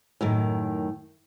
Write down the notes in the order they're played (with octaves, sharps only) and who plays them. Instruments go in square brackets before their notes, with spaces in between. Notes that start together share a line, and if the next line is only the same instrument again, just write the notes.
[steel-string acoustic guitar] F#2 A2 D#3